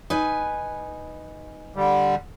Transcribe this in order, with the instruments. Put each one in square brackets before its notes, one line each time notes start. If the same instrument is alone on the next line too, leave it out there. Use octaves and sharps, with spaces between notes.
[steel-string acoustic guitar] D#4 B4 G#5
[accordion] D3 G3